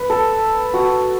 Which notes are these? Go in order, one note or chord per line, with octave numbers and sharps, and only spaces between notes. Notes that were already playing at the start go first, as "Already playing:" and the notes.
Already playing: B4
A4
F#4